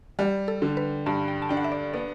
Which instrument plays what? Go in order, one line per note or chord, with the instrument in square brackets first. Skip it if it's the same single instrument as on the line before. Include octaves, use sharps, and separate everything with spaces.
[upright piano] G3 [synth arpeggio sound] G4
[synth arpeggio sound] A4
[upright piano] D3
[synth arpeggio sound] B4
[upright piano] G2 [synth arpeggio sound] A5
[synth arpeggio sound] G5
A5
[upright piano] D4 [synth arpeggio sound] G5
[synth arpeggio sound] F#5
E5
D5
[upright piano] B3 [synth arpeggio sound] D5